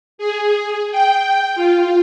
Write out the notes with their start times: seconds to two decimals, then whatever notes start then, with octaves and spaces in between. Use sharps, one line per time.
0.18 G#4
0.91 G5
1.55 F4